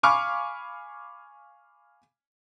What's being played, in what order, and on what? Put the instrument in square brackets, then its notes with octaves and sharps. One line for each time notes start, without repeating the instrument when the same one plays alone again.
[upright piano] F5 G#5 B5 C#6 D6 F6